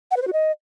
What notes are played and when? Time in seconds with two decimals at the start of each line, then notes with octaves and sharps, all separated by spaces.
0.11 F#5
0.17 B4
0.22 C5
0.27 F#4
0.33 D#5